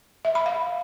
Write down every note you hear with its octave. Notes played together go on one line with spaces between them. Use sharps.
E5
B5
F5